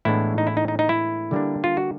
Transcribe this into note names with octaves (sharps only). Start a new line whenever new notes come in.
A2 E3 G#3 B3 D4 E4
D#4
E4
D#4
D#4
D#4
E4
D3 G3 A#3 D4
F4
F#4